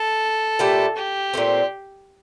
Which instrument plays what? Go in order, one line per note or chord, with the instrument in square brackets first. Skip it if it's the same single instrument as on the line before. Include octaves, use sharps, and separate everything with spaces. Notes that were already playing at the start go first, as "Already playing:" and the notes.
Already playing: [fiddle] A4
[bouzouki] A#2 A3 E4 G4
[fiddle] G4
[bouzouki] A#2 A3 C4